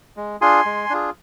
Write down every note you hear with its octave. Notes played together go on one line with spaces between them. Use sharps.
G#3
D4 F4 G#4 G#5 C6
G#3
D4 F4 G#4